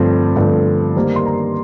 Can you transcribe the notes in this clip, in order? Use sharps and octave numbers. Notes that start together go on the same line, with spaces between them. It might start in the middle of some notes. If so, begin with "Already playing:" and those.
Already playing: G2 D3 F3 A3 C4
G2 D3 F3 A3 C4
D#3 G3 A#3 C5
C6
A#5